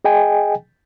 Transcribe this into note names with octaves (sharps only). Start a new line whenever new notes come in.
G#4 D#5 G5 G#5